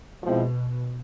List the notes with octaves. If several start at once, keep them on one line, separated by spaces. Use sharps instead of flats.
B2 F3 G#3 C4 E4